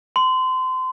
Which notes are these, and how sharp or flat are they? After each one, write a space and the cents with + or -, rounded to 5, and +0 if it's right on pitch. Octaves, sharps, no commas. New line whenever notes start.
C6 -30